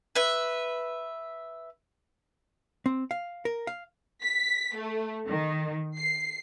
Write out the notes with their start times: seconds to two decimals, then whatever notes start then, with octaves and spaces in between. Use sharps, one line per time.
0.15 B4 E5
2.86 C4
3.11 F5
3.45 A#4
3.67 F5
4.23 B6
4.75 A3
5.28 D#3
5.96 C7